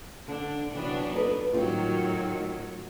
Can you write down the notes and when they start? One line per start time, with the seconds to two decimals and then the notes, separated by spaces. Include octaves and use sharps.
0.28 D3 D4
0.71 C3 E3 F#3 B3 D4
1.13 D#4 A4 B4
1.53 A2 D#3 F#3 C4 F4 G4